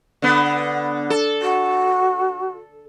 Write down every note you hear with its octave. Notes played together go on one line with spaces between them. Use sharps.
D3 B3
A4
F#4